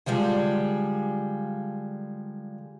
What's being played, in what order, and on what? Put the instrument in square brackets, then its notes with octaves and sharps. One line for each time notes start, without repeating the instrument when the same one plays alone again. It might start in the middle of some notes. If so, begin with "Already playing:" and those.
[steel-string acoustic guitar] D3 F3 G3 G#3